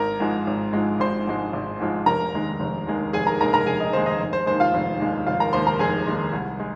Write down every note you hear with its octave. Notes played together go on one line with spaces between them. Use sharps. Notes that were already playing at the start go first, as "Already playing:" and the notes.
Already playing: G#1 A#4 A#5
G#2 F3 G#3
G#1
G#2 F3 G#3
G#1 C5 C6
G#2 F3 G#3
G#1
G#2 F3 G#3
F1 A#4 A#5
D#2 D#3 G#3
F1
D#2 D#3 G#3
F1 G#4 G#5
A#4 A#5
D#2 D#3 G#3 A#4 A#5
A#4 A#5
F1 G#4 G#5
D#5
D#2 D#3 G#3 C5
D#5
F1
C5
D#2 D#3 G#3 C5
F4 F5
F1
D#2 D#3 G#3
F1 F4 F5
A#4 A#5
D#2 D#3 G#3 C5 C6
A#4 A#5
F1 G#4 G#5
D#2 D#3 G#3
C2
G#3